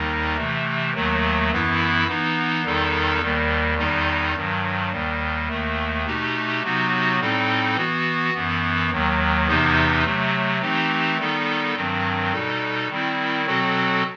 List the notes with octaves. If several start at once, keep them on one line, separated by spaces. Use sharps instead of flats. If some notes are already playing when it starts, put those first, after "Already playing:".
Already playing: D#2 D#3 G3 D#4
C3 E3 A3
D#2 D#3 F#3 A3
F#2 E3 B3 E4
E3 B3 D#4
E2 D#3 G3 D#4 A4
D#2 D#3 G3
E2 D#3 G3 D#4
G2 D#3 F#3
D#2 D#3 G3
D#2 D#3 A3
B2 A3 D#4 G4
C3 F#3 B3 D#4 F#4
A2 G3 C4 D#4 A4
E3 B3 F#4
F#2 E3 B3
D#2 D#3 F#3
E2 C3 E3 B3 D#4
C3 F#3 A3
E3 A3 C4 D#4 G4
D#3 G3 B3 D#4 A4
G2 D#3 F#3 C4
B2 G3 D#4 A4
D#3 G3 C4 E4
B2 F#3 C4 F#4 A4